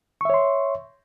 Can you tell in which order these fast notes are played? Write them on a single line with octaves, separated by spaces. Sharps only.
C#6 E5 C#5 C6